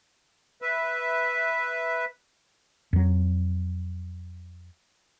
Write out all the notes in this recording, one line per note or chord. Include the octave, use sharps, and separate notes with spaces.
B4 E5
F2 F#3